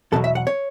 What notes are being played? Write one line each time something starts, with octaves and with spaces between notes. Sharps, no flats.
E2 B2 F#3 A4
E5
F#5
C#5